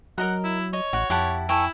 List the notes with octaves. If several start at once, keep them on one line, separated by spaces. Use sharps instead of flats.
F#3 A#4 D#5 F#5 A#5
E4
C#5 D#5
A1 F#4
F2 E4 G4 F#5 A5
E4 A4 C#5 G5 G#5